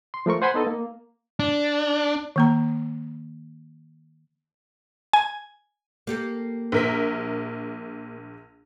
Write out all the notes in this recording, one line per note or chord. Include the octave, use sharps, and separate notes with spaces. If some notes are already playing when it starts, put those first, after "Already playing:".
C6
F3 A3 A#4 C#6
C5 F#5 G#5 B5 C6
B3 D#4 A4 D#5
A#3
D4
D#3 A#3 A#5
G#5
A#3 G4 A4
A#1 A#4 B6